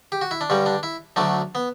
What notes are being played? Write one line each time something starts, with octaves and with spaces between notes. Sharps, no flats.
G4
F#4
E4
D4
G2 D3 G3 C#4
D4
E4
D2 D3 F#3 A3 D4
B3